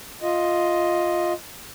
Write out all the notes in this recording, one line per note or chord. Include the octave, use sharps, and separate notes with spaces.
F4 D#5